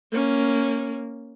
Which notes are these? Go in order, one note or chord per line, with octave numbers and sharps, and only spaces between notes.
A#3 C#4